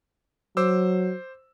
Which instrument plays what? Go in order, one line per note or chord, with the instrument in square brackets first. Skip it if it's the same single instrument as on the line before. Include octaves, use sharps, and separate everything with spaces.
[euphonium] F#3 [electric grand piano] C5 D6 E6